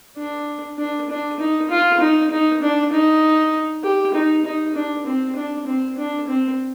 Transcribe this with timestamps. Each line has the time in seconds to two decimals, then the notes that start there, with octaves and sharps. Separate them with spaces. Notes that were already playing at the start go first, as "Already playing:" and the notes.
0.18 D4
0.78 D4
1.10 D4
1.39 D#4
1.70 F4
2.01 D#4
2.31 D#4
2.62 D4
2.92 D#4
3.84 G4
4.14 D#4
4.45 D#4
4.75 D4
5.06 C4
5.36 D4
5.67 C4
5.98 D4
6.28 C4